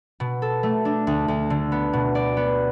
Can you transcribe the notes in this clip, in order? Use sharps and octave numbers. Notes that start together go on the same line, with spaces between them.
B2
A4
A3
D4
D2
D2
D3
B3
B2
D5
B3